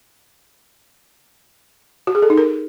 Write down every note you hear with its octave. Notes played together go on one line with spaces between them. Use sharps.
F#4
G#4
A4
D#4
A#4